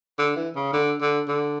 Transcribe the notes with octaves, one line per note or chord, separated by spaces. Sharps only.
D3
E3
C#3
D3
D3
D3